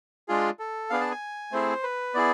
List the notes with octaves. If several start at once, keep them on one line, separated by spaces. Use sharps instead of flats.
G#3 D4 F4 G#4
A4
B3 D4 G#4 F5
A5
G#5
A3 C4 E4 G#4 C5
B4
B3 E4 G#4 D5